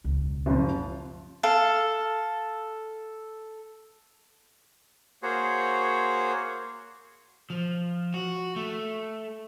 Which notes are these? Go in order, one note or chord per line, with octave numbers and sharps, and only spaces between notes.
E1 C#2
F#1 F3
A4 F5
A#3 F#4 G#4 C5 C#5
F3
F#4
A3